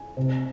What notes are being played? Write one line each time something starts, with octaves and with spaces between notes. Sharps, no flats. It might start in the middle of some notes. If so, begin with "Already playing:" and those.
Already playing: G#5
C3